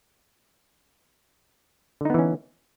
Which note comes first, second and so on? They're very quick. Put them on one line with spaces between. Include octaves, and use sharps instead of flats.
D3 D#4 B3 E3 C#4